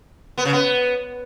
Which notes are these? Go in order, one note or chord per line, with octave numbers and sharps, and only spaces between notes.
B3
C#3
B3